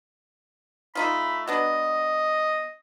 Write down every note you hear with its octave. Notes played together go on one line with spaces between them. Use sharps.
A3 D#4 F4 B5
F#3 B3 D4 D#5